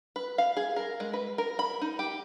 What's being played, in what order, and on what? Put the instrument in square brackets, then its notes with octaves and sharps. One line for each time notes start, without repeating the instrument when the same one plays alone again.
[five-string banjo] B4
F5
G#4
A#4
G#3
B4
A#4
B5
D#4
G4